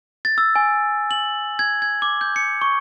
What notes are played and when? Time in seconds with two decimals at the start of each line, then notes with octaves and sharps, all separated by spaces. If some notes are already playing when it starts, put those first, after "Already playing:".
0.25 A6
0.38 E6
0.56 G#5
1.11 F#7
1.59 G#6
1.82 G#6
2.02 D6
2.21 G6
2.36 C#7
2.62 C#6